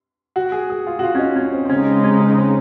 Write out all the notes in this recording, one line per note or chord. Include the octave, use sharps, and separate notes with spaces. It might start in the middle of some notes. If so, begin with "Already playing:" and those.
F#4
G#4
G#4
F4
F#4
F4
C#4
D#4
C#4
C4
C4
C#3 G#3 C#4 D#4
C4
C#4
C#4
C4